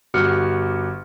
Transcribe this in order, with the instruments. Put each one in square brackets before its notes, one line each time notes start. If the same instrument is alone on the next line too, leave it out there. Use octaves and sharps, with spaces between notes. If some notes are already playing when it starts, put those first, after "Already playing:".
[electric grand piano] G1 F#4 G4 F6 C#7